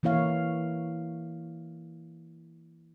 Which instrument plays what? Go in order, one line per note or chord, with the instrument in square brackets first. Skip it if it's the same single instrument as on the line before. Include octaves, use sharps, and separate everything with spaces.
[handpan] E3 A#3 E4 C#5 F5